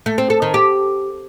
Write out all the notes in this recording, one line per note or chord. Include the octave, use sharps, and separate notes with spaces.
A3
C4
A4
D#3
G4